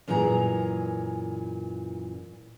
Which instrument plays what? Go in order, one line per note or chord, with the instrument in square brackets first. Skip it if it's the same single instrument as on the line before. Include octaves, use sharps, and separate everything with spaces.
[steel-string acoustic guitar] F#2 A#2 E3 G#4 A#5